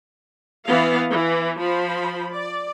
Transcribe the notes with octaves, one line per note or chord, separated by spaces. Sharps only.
E3 B3 F5
E3
F3 C5 B5
D5